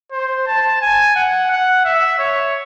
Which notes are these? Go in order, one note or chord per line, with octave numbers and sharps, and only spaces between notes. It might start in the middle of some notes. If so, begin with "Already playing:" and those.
C5
A5
G#5
F#5
F#5
E5
C#5